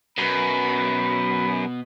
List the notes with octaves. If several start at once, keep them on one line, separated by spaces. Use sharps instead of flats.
F#2 B2 B3 B5